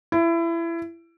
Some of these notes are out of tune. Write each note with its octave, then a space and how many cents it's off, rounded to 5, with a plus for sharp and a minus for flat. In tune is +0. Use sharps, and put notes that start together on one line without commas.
E4 +25